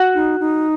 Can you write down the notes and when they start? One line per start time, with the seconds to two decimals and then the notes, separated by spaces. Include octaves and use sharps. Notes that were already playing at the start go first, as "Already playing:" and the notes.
Already playing: F#4
0.14 D#4
0.40 D#4